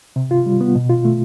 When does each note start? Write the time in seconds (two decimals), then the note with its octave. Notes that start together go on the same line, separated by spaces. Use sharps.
0.16 C3
0.31 F4
0.46 G3
0.61 B3
0.75 B2
0.90 F4
1.05 A3